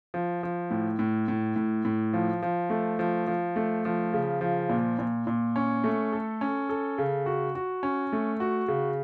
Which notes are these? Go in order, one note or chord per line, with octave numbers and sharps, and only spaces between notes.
F3
F3
A2
A2
A2
A2
A2
F3
F3
A3
F3
F3
A3
F3
C#3
F3
A#2
A#2
A#2
C#4
A3
A4
C#4
A4
C#3
F#4
F#4
C#4
A3
F#4
C#3